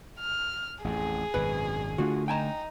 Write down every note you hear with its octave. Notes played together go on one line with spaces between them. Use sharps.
F6
A1 F2 G#4
G#1 F#2 B2 B4
D3 A3 D4 F4 F#4
D#4 G5 G#5 A#5